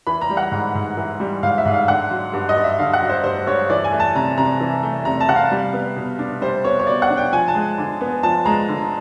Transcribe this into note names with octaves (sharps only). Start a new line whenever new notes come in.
E3 B5
A#5
G3
F#5
G#2
G#2
E3
G3
G#2 F5
E5
G#2
F5
D3 F#5
F#3
G2
D#5
G2
E5
D3 F5
F#5
F#3
C5
G2 C5
G2 C#5
E3 D5
G#5
A3
A5
C3 A#5
C3 A#5
E3
A3
C3 A#5
A5
C3 F#5
F5
G3
B3
B2
D4
G3 C5
B3 C#5
C#5
B2 D5
F#5
D4
G5
F3 G#5
A5
G#3
D3
B3
F3 A5
G#3 A#5
D3